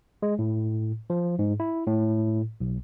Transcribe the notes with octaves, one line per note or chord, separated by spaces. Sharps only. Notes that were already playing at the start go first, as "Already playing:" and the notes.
G#3
A2
F3
G#2
E4
A2
B1